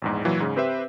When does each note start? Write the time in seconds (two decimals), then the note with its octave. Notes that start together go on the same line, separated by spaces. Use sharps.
0.02 A#1 E2 G#2
0.25 A#2 E3 F#3
0.40 G#2 C#3
0.56 C4 G4 B4 C5 E5